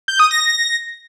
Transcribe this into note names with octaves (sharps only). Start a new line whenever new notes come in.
G6
D#6
A#6